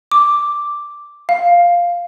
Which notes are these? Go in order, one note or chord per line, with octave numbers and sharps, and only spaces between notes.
D6
F5